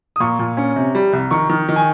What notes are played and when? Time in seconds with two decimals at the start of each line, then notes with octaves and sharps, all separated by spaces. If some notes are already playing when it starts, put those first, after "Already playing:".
0.16 D#6
0.20 A#2 A#5 C#6
0.39 A#2
0.57 C#4
0.76 C3
0.95 G3
1.13 C2
1.31 D#3 A#5 C#6
1.49 D#3
1.69 D#3
1.76 G#5